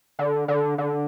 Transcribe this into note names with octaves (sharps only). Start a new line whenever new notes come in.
D3
D3
D3